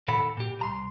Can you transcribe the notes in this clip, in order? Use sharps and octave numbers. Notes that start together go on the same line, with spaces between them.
A#2 D#3 A4 F#5 B5
A#2 G4
C2 A#5 C6